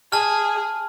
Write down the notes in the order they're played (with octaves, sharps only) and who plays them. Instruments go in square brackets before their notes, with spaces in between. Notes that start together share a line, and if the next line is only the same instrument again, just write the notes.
[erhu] G#4 [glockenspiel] A5 F6